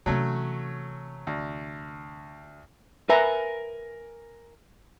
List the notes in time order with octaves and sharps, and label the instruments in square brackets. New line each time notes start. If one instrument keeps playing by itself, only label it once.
[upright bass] C3 E3 [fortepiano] F#3 A3 C#4
[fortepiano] D2
[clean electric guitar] A#4 G#5 [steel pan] B4 E5 A#5